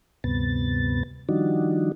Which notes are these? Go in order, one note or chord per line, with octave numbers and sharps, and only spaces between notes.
D2 G2 C3 B3 A6
D#3 F3 G3 D4 D#4 F#4